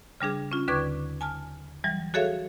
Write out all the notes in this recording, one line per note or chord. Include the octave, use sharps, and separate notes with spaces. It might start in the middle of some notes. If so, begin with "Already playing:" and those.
C#3 G3 D4 G#4
C#4 F4
D#2 D3 B4 C#6 D6 G#6
G#5 A5 F6
E3 F#3 G3
F#4 G#4 A4 C#5 E5 F5